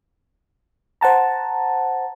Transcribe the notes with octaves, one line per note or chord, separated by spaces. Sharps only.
C5 F#5 A5 A#5